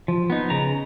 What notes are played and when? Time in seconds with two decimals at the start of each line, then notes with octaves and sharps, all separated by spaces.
0.08 F3
0.30 B3 D#4
0.50 C#3 A#5